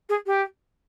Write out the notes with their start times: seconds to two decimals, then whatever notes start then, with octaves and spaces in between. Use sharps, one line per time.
0.09 G#4
0.26 G4